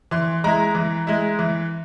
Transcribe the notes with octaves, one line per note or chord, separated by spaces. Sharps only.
E3 C6
G#3 E4 A#5
E3
G#3 E4
E3